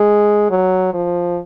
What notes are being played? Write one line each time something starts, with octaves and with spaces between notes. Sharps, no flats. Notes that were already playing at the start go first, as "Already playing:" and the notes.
Already playing: G#3
F#3
F3